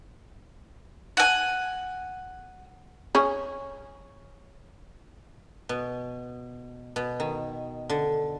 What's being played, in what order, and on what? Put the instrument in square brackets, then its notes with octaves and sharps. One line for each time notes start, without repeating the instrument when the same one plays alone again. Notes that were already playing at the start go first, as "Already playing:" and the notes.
[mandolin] F#5 G#5
[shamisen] C#4 G#4
[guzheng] B2
B2
D#3
D3